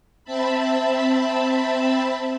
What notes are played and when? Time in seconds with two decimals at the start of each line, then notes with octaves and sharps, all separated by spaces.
0.24 C4 E5 A5 B5